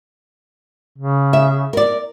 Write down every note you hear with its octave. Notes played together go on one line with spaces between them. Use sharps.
C#3
E5
A#4 D5